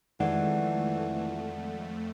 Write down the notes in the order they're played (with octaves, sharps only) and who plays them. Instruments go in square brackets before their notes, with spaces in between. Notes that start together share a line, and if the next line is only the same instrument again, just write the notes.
[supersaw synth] F2 A3 [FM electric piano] D#3 G#3 [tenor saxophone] E3 [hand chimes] D5 F#5